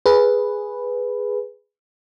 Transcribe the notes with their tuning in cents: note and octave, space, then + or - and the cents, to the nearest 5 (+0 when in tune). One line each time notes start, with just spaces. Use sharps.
G#4 +0 B4 +0